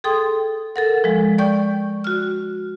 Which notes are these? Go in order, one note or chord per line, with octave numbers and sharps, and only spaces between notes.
G#4 A4 G5 C6 D#6
A4 A#4 F#5
F3 G#3
D5 G5 C#6 G6
F#4 F6